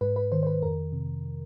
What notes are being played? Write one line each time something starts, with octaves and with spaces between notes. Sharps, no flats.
G#2 B4
B4
D#3 C5
C5
B4
F2 A#4
C3